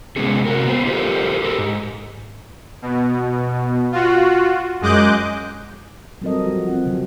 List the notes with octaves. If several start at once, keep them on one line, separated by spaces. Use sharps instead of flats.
C3 G#3 B3 C#4 G#4
C3 F#4 A#4
B3 C5
D#4 F4 G4 A4 A#4 C5
G4 A4 A#4
G#2
B2
F4 F#4
F#2 G#3 D#5 D6 F#6 G6
F#3 G3 C4 A4 A#4 D#5
F3 F#4
C4 F#5
C#3 F#3